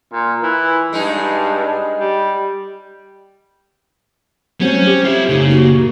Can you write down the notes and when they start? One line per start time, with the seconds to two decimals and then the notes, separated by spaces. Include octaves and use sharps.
0.14 A#2
0.43 E3
0.93 G2 G#3 D#4 G#4
2.00 G3
4.61 F#3 G3 A3 C4 C#4 C5
4.87 G4
5.04 F4 E5
5.29 F#2 C#3 A3 D#4
5.50 A#3 F#4
5.69 A#2